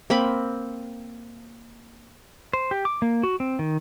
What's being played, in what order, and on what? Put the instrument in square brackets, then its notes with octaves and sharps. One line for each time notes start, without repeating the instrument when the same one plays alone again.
[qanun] A#3 C4 B5
[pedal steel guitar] C5
G4
D6
A#3
F#4
C4
D#3